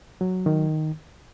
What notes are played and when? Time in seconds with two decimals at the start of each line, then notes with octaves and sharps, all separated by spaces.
0.21 F#3
0.46 D#3